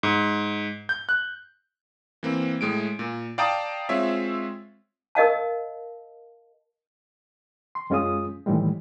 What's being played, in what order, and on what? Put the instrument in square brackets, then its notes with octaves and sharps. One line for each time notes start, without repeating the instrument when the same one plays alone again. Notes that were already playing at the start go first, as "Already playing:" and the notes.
[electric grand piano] G#2
G6
F#6
E3 A#3 C4
A2 G#3 D7
A#2
D5 F5 G5 A5 A#5 D#6
G#3 C4 F4 C#5 E5
[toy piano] A#4 D#5 F5 A5
[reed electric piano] C6
F#2 G#3 C#4 F4 G#4 D#6
A2 D#3 E3 G3 G#3